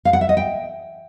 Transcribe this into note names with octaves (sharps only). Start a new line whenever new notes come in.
F5
F#5
E5
D#5
G5